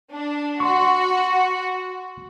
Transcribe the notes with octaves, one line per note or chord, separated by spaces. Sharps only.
D4
F#4 C6 C#6